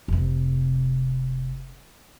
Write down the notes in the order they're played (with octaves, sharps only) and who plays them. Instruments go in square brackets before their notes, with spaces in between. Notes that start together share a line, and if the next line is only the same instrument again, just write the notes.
[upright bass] F1 C3